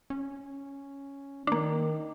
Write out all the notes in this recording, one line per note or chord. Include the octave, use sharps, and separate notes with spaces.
C#4
D#3 A#3 D4